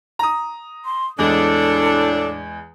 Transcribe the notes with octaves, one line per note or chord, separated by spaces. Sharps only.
A#5 D#6
C6
E2 A2 G#3 D4 A4